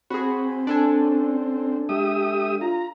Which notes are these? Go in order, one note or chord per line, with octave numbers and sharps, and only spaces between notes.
C4 F#4 G#4 B5
D4 A4 G#5
C#4
G#3 G4 E5 D#6
F4 A#5